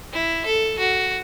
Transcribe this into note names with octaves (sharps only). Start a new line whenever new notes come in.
E4
A4
F#4